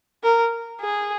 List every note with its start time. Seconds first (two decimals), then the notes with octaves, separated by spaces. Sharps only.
0.24 A#4
0.80 G#4